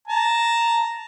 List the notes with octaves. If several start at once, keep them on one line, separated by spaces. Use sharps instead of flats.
A5 A#5